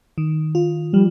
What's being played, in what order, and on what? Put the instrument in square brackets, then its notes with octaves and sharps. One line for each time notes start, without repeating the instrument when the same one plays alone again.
[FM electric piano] D#3
F4
[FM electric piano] F3 [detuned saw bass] G3